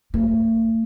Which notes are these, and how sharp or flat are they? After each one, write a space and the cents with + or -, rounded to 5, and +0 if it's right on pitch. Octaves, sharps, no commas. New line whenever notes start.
A3 +40